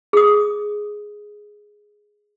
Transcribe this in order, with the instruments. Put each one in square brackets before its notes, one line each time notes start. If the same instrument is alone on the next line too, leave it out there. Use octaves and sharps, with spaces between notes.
[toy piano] G#4 D#6